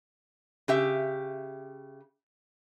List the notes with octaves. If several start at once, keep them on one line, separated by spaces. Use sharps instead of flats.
C#3 G4 E5